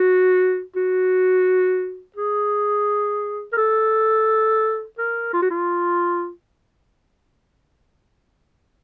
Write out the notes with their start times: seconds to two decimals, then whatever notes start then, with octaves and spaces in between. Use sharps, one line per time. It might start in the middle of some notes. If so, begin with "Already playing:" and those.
Already playing: F#4
0.76 F#4
2.16 G#4
3.53 A#4
3.57 A4
4.98 A#4
5.33 F4
5.42 F#4
5.50 F4